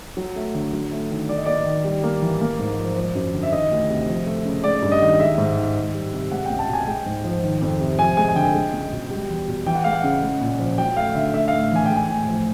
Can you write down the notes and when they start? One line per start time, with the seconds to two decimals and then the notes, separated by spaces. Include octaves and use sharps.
0.17 F#3
0.36 A3
0.55 D3
0.73 F#3
0.92 A3
1.10 D#3
1.29 F#3 D5
1.37 D#5
1.46 A#3 D5
1.66 D#3
1.85 G3
2.04 A#3
2.22 E3
2.41 A#3
2.59 G#2
2.78 F3
2.96 F3
3.15 F#2
3.34 D3
3.43 E5
3.52 D#3 D#5
3.71 D2
3.89 C3
4.08 F3
4.26 A3
4.45 C#3
4.64 G#3 D5
4.83 G2
4.92 D#5
5.01 D#3
5.20 G#3 E5
5.38 G#2
5.57 D#3
5.76 D#3
5.94 G3
6.13 C3
6.31 G#3 F#5
6.45 C#2 G5
6.59 A5
6.68 B2 G#5
6.87 G#3 G5
7.06 G#2
7.24 F3
7.43 D#3
7.62 F2
7.80 C3
7.99 F3 G#5
8.17 G#3 G#5
8.29 G#5
8.36 D3 G5
8.55 G#3
8.73 C#2
8.92 B2
9.10 G3
9.29 E2
9.48 B2
9.66 E3 G5
9.75 F#5
9.84 G#3 F5
9.93 F#5
10.04 C#3
10.22 G#3
10.41 A#2
10.59 F3
10.78 F#3 G5
10.96 A3 F5
11.15 D3 E5
11.34 A3 E5
11.48 A2 F5
11.71 E3 G#5
11.86 G#3 G5
11.96 G#5
12.09 A2
12.27 F3